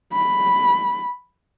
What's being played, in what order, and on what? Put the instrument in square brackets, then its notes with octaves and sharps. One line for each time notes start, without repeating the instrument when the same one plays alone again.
[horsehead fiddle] B5